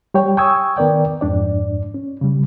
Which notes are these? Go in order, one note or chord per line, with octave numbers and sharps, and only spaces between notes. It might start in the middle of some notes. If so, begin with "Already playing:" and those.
G3 G4 C#5 G5
G5 G#5 C#6 D#6 E6 G#6
D#3 B3 A#4 D5 G5
F2 G#2 D4 D5
C#4
C#3 G3